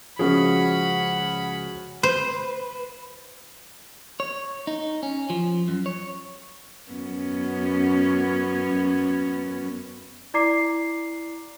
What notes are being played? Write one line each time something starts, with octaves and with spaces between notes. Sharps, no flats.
C#2 F3 C#4 F#4 G#4 F#5 B5
B4 C5
C#5
D#4
C#4
F3
F#2
C#5
F#2 B3 C#4
E4 D5 A#5 D6 C7